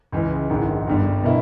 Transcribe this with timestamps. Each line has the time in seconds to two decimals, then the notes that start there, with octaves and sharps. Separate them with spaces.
0.12 C#2 C#3 E3 G#3
0.49 A#1 G#2 D#3
0.87 G1 G2 G3
1.23 B2 A#3 E4